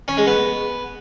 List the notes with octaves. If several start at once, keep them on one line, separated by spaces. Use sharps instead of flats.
C#4
G#3
B3